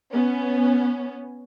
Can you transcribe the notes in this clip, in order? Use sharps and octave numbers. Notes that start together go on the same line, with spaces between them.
B3 C#4